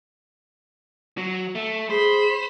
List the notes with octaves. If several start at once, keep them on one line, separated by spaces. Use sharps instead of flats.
F#3
A3
G#4 C5 B5